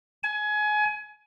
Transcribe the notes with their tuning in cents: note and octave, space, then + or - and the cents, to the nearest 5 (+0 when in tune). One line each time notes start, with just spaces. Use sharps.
G#5 +25